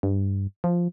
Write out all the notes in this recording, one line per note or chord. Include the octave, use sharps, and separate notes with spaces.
G2
F3